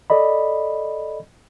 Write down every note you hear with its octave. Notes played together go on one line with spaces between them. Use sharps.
A4 D5 D#5 B5